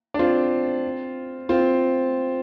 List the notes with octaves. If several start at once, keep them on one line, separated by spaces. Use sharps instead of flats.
D4
C4 F4
C4 F4